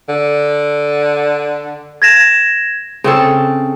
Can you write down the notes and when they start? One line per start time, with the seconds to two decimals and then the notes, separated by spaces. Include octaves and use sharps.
0.09 D3
2.02 G#6 A#6 E7
3.04 C#3 C4 A4